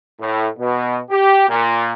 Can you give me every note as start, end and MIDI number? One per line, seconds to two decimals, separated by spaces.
0.19 0.46 45
0.58 0.99 47
1.10 1.44 67
1.49 1.94 46